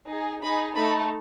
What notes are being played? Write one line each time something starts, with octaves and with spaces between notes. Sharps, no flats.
D#4 G#4
D#4 G#4 B5
A3 D#4 A4 B5